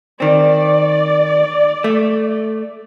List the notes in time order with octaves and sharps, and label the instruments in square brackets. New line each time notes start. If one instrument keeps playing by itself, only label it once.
[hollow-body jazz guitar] D#3 C4 [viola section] D5
[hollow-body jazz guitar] A3